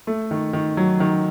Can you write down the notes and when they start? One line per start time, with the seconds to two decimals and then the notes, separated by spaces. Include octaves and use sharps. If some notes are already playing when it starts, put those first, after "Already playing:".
0.07 A3
0.31 D#3
0.53 D#3
0.77 F#3
1.00 D#3